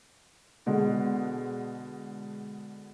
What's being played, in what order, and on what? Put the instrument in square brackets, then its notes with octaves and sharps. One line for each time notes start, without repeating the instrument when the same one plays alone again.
[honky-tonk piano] B2 D3 G#3